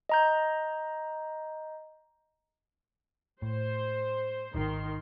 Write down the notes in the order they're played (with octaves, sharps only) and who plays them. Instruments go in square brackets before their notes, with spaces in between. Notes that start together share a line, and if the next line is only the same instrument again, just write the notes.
[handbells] D#5 A#5 G6
[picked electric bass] A2 [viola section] C5
[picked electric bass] D#1 G#1 [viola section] D#3 C6